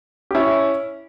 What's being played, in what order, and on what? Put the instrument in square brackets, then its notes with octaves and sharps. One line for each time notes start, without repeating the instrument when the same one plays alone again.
[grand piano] G4
C#4 E4